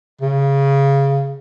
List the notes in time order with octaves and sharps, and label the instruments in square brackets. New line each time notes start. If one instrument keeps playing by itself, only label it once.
[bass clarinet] C#3